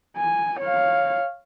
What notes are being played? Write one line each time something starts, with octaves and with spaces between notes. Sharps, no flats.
G#5
C#5 F5